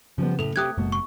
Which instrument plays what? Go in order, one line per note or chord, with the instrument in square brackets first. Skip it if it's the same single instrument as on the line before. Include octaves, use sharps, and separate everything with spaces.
[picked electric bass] C#3 [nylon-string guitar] F3 G3 B3
[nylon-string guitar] A2 C#4 [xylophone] A4 F7
[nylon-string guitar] C3 A3 G4 [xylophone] D#6 F#6 G#6
[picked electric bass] F#1 G#3 A#3 [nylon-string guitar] B2
[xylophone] C#6